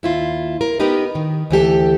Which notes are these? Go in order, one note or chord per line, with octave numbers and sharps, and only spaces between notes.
D#2 E4 F4
A#4
B3 D#4 G4 A#4 B4
D#3
D2 E3 G4 A4